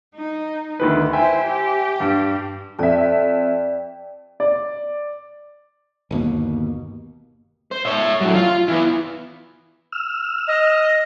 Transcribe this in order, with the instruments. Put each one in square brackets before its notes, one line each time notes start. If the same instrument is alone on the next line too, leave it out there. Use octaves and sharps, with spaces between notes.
[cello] D#4
[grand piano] D2 D#3 B4
[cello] E4 C5 [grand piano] E5 G5 G#5
[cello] G4
[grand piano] G2 G3
[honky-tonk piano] F2 E5 [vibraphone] D5 G5
[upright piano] D5
[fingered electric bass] G1 D#2 B2 A#3
[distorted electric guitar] C5
C#5 E5
A2 F#3
F4
E3 B3
[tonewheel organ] E6 F6
[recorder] D#5